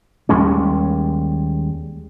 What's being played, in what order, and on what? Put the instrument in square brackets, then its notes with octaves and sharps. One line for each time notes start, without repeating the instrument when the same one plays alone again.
[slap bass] D#2 G3 G#3 C#4